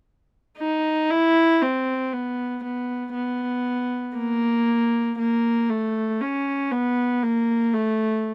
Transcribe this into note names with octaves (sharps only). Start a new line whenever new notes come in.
D#4
E4
C4
B3
B3
B3
A#3
A#3
A3
C#4
B3
A#3
A3